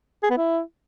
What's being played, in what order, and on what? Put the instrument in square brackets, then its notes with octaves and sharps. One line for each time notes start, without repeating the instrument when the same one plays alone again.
[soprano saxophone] G#4
B3
E4